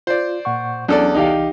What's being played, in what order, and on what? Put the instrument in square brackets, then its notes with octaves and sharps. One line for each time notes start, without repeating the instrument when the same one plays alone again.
[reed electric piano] F4 [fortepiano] C5 D5
[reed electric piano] A#2 F#5 C#6
[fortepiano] E2 A4 D5 [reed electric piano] F#3 C#4 D4
[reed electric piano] C2 E3 [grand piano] D#4 G4 F5